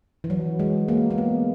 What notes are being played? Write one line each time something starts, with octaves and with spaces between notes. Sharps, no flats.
E3
F#3
G#3
A#3
A#3
B3